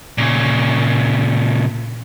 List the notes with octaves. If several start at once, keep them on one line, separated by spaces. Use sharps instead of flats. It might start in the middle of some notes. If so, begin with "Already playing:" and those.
A#2 C#3